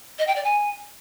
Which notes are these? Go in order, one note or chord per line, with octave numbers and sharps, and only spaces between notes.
D#5
G5
D5
G#5